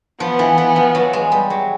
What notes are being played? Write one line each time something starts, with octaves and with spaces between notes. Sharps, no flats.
F3 B3
E3
E3
F3
F#3
G#3
G3
F#3